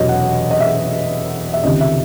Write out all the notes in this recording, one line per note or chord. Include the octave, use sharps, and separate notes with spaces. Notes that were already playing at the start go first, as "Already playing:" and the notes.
Already playing: E1 E2 C3 F#3 C#5 D#5
F#5
D#5
E5
E5
C#2 C3 D#3 D#5
E5